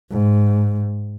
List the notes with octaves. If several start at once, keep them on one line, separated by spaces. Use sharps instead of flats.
G#2